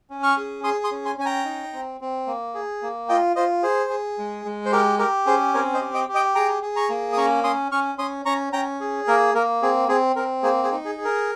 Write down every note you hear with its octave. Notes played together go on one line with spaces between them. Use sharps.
C#4
C#6 F6
G#4
G#4 C6 D#6
C6 D#6
C#4
G#5 C6
C#4 G#5
G5 A#5
D#4
C4
C4
A#3
G#4
A#3
F4 D#5 G5
F4 C5 D#5
G#4 C5
G#4
G#3
G#3
C5
G4 A#4
G4 A#4
C#4 G#4 C5
C4 A#4 C#5
C5 D#5
G4
D#5 G5
G4
D#5 G5
G#4 G5 A#5
G#4
A#5 C#6
A#3
D#6
C#4 A#5 C#6
C#4 C6 D#6
C#4 C#6 F6
C#4 C6 D#6
C#4 A#5 C#6
C#4 G5 A#5
G#4
A#3 A#4
A#3 A#4
C4 G#4
C4 G#4
C4 A#4
A#3 G#4 C5
G#4 C5
D#4
G#4
G#4
A#4